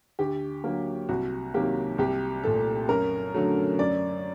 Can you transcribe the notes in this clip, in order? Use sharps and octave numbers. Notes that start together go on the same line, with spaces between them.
D2 G4
D3 F#3 A#3
C2 F#4
C3 D#3 F#3 A#3 G4
C2 G4
A#2 A3 A4
F#2 A#4
D3 F#3 A3
F#2 D5